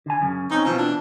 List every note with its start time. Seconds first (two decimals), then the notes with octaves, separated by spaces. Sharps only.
0.06 D3 G#5
0.22 F#2 C#3
0.51 C4 C#4 D#4
0.65 B2 E3 F3 C4
0.78 D4